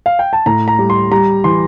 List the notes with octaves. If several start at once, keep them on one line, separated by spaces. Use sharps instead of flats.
F5
G5
A5
A2 A#5
A#5
G3
C6
G3 A#5
E3 C6